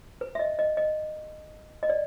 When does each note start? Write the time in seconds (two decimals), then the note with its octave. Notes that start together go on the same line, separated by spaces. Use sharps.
0.21 B4
0.35 E5
0.39 D#5
0.59 D#5
0.77 D#5
1.83 D#5
1.89 D5